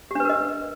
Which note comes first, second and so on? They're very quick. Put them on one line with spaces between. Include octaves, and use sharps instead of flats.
G4 D4 B4 A#4 D#5